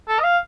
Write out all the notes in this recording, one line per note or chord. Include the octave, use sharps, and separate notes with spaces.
A4
D#5
F5